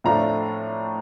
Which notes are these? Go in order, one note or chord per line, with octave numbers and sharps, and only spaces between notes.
A2 F3 A3 D4 F4 A#5